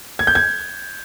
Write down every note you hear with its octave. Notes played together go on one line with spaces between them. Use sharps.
G#6
G6
G#6